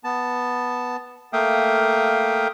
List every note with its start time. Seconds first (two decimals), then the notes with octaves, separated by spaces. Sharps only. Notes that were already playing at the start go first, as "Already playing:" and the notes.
0.04 B3 A5
1.33 A3 A#3 E5 F5 G5 D#6